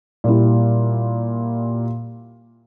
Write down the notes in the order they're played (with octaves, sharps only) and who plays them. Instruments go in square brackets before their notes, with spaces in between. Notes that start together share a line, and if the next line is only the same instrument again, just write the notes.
[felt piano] A#2 G3 E4